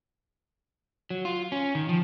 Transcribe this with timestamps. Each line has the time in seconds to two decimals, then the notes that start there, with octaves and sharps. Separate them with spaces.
1.10 F#3
1.25 F4
1.52 C#4
1.75 D#3
1.89 F3